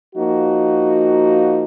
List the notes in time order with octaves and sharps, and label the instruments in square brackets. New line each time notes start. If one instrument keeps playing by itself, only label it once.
[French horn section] F3 A#3 D#4 F#4